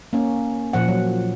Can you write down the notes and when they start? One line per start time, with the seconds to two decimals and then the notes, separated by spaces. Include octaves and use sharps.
0.13 A#3 C#4
0.73 A#2 F3 F#5
0.88 F#3